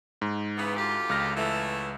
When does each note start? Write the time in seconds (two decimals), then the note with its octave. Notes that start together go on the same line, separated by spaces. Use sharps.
0.22 G#2
0.57 C#3 E3 B3
0.77 D2 F4 G4
1.10 C#2 F6 A#6
1.36 E3 A3